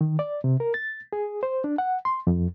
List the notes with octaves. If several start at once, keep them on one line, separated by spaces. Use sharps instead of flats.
D#3
D5
C3
A#4
A6
G#4
C5
D4
F#5
C6
F2